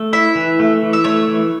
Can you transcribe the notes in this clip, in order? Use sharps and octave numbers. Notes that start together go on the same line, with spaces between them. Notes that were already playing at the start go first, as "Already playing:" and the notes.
Already playing: A3
E4 E5
E3
A3
E3
E5
A3 C#5
E3